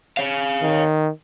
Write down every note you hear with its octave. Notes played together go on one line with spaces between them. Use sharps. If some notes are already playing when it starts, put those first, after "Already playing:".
C#5 F5
D#3